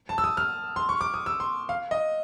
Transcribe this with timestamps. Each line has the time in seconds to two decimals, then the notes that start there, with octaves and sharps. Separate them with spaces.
0.09 A5
0.18 E6
0.24 D#6
0.37 F6
0.76 C6
0.89 C#6
1.01 D6
1.14 D#6
1.26 E6
1.40 C6
1.69 F5
1.91 D#5